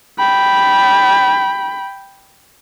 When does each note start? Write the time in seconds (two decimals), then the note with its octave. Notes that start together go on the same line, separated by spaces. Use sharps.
0.19 G5 B5